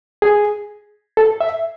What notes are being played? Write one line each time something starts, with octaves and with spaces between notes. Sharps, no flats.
G#4
A4
E5